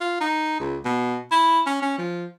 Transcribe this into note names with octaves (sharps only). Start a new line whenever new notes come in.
F4
D#4
C#2
B2
E4
C#4
C#4
F3